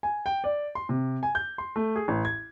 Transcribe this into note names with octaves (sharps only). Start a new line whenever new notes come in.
G#5
G5
D5
C6
C3
G#5
G6
C6
A3
G#4
A1
G#6